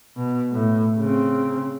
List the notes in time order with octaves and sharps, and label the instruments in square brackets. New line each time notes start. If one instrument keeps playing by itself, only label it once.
[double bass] B2
A2
C#3 C4